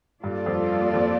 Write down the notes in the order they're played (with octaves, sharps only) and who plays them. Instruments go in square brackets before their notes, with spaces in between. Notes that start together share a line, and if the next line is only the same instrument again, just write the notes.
[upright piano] G2 [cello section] G3 A#3 F4 A4 D5
[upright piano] F2
F2